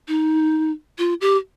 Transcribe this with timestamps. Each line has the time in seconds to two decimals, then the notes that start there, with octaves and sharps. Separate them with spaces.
0.08 D#4
0.98 F4
1.21 G4